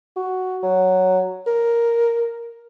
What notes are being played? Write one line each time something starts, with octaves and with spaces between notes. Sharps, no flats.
F#4
F#3
A#4